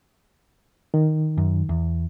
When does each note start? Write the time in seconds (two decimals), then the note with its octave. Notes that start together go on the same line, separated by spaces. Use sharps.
0.94 D#3
1.37 F#2
1.69 E2